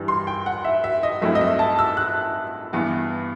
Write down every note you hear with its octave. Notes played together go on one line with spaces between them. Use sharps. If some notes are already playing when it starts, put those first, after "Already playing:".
Already playing: G2 E3 G3
C6
G5
F#5
E5
E5
D#5
G2 F#3 A3 C4 E4 E5
D#5
E5
A5
E6
F#6
G2 E3 B3